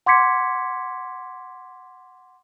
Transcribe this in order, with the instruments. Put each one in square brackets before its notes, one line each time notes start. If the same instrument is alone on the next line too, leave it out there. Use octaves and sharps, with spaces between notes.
[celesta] F#5 C6 D6 G#6 B6 C#7